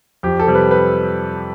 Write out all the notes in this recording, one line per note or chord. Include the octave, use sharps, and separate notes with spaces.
F2 G4
A4
C3 G3
B4
B4